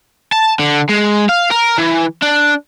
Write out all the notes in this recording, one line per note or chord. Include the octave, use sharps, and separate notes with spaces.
A5
D3
G#3
F5
A#4
E3
D4